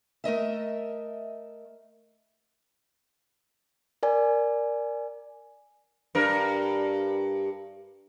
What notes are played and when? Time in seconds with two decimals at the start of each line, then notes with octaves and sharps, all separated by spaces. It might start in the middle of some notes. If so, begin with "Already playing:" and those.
0.24 A3 A#4 D#5 E5
4.03 A#4 D5 G#5
6.15 G2 A#4